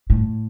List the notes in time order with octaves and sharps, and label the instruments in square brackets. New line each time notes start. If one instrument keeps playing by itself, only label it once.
[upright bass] A2